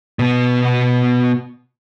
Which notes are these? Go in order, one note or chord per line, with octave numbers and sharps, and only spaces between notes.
B2 B3